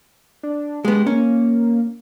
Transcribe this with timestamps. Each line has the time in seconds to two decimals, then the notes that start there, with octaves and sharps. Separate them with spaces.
0.43 D4
0.85 G#3 B3 G4
1.07 A#3 C#4